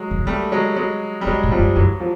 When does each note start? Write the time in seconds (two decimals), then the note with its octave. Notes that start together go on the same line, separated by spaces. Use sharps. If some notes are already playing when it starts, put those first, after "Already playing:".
Already playing: F#3 G#3
0.11 D#3
0.18 D3
0.25 D#3 G3 A3
0.52 F#3 G#3
0.76 F#3 G#3
1.21 G3
1.26 D3 F#3 G#3
1.43 A2
1.51 F3 G3
1.59 G2
1.75 F#2 E3 F#3
2.00 F3